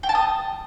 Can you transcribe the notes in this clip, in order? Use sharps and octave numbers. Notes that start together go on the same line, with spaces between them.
G5
A5
D#6